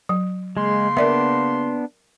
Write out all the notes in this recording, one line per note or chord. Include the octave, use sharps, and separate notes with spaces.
F#3
C#3 G#3 A#3 C6
B3 D4 A#4 D5 E5